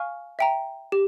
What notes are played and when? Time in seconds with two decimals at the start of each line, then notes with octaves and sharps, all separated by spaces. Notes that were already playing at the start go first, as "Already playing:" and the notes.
Already playing: F5 G#5 C#6 F6
0.39 E5 G5 A#5
0.92 G4